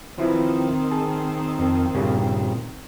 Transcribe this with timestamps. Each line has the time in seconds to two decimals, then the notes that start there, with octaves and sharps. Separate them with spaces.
0.18 D#3 F3 C4 E4 B4
0.91 G#4 A5
1.59 F2
1.95 G2 A#2 C#3